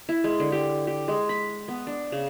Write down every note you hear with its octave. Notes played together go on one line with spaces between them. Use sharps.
E4
G#3
D3
G4
G4
G#3
B5
B3
D4
C#3